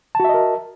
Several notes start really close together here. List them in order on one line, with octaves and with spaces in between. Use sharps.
A5 F#4 E5 D#5 A#4